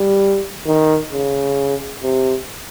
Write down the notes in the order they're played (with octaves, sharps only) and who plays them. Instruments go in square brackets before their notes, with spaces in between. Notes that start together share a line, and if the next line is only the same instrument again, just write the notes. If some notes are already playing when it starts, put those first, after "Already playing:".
Already playing: [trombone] G3
D#3
C#3
C3